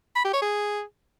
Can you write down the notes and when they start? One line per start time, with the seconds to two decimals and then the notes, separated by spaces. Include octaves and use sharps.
0.16 B5
0.24 G4
0.33 C#5
0.42 G#4